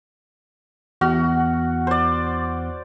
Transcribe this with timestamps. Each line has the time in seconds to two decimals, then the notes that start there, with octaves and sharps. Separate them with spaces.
1.01 E2 F#4 F6
1.87 C5 D5